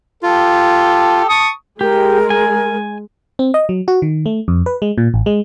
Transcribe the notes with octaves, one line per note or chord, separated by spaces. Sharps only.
F4 G4 A4
A5 C#6 D#6
G#3 G4 A#4
G#5
C4
D#5
F#3
F#4
D#3
A3
F2
B4
G#3
A#2
A1
G#3